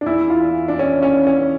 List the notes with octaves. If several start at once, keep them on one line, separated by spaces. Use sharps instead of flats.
D4
E2 E3 E4
F4
D4
C#4
C#4
C#4